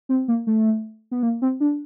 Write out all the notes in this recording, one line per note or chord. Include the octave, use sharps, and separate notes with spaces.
C4
A#3
A3
B3
A#3
C4
D4